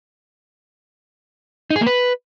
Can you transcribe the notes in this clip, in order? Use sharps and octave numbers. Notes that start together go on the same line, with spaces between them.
D#4
G#4
A#3
B4